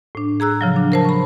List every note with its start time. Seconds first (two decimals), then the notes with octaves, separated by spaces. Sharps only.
0.15 A2 D4
0.40 G#4 A#5 E6 F#6
0.61 C#3 F3 F#3
0.76 D4
0.92 A#4 C5 A5
1.05 B5 C#6